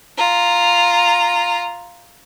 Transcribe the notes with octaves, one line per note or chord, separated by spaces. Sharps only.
F4 A#5